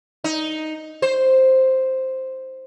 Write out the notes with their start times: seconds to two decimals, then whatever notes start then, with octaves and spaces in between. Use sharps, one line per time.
0.24 D#4
1.02 C5